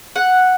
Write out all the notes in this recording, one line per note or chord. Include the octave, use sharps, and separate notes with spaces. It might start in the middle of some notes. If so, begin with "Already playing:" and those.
F#5